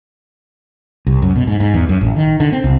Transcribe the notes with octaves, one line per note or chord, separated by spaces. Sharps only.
C2
F#2
B2
G#2
G#2
E2
F#2
A1
D#3
D3
C4
C2